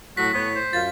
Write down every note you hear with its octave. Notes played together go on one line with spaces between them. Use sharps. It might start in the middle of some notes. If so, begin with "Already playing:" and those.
A2 F#3 F#4 B6
A2 B3 C#5
C5
F#2 F4 A6